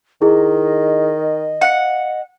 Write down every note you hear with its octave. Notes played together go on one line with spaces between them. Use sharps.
D#3 E4 G#4 D#5
F5 F#5 C#7